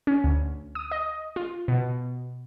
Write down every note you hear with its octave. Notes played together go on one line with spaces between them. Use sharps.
C#4
D2
D#6
D#5
F4
B2